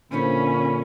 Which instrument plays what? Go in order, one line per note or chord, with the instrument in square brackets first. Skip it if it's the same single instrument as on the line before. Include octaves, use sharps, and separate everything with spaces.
[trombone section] A#2 D3 [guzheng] F3 D#4 E4 [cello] C#4 [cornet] B5